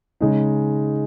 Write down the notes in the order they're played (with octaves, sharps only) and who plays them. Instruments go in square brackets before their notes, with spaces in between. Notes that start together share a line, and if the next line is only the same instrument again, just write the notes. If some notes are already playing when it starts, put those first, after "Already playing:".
[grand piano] C#3 G#3 D#4